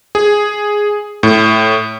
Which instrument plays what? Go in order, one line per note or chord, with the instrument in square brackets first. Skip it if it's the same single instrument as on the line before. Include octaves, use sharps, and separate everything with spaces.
[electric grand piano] G#4
A2